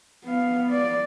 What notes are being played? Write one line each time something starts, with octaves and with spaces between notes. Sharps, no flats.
B3 F5
D5